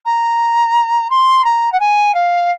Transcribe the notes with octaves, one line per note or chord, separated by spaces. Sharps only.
A#5
C6
A#5
F#5
G#5
F5